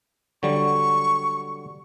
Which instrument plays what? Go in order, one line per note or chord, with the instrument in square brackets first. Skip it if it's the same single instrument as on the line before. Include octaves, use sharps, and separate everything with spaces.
[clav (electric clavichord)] D3 F#3 G3 [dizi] C#6